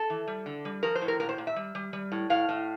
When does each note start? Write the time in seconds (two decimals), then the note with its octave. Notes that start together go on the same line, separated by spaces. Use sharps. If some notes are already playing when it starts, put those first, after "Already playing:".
Already playing: A4
0.10 E3
0.27 G3
0.46 D3
0.65 G3
0.83 F3 A#4
0.95 C5
1.02 A2
1.08 A#4
1.20 A#2 A#4
1.29 C5
1.38 A#2
1.47 E5
1.56 G3
1.75 G3
1.93 G3
2.12 A2
2.30 A2 F5
2.49 A2